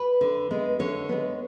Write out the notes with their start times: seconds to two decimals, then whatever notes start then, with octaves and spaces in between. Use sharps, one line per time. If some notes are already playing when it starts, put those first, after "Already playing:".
Already playing: B4
0.21 D3
0.51 G#3 B3
0.79 D3 C#5
1.09 G#3 B3